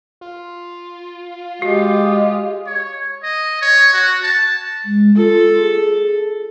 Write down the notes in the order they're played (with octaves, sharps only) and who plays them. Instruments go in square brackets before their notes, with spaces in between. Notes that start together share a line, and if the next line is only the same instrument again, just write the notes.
[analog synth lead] F4
[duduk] G#3 [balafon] F#4 [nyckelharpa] G4
[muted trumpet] C#5
D#5
C#5
F#4
A5
[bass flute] G#3
[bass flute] F4 [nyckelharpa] A4
[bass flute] G#4